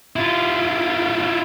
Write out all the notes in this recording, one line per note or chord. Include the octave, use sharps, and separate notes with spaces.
E4 F4